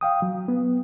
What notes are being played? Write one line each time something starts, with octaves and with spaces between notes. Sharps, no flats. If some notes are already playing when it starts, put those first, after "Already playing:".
F5 G5 D#6
F#3
B3